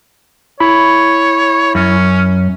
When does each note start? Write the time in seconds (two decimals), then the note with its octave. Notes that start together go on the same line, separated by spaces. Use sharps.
0.60 E4 C#5 B5
1.75 F#2 C#4